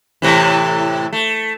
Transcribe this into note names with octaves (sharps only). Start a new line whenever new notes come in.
A2 C3 E3
A3